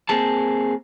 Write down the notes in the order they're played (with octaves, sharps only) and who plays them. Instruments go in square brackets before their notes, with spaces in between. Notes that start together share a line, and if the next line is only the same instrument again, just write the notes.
[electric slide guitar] A#3 C4 G#4 A5